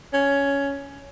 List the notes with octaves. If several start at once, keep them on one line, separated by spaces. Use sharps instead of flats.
C#4